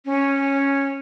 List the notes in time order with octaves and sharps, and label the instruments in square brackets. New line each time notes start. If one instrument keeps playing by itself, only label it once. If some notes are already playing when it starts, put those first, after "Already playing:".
[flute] C#4